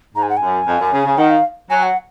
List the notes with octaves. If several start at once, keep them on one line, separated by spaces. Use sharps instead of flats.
G#2 A#5
G#5
F#5
F#2 G#5
F2
F#2
C#3
C#3
D#3 F#5
F5
F#3 G#5
F#5